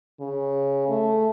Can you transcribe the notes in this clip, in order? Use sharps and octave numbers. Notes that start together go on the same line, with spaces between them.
C#3
A3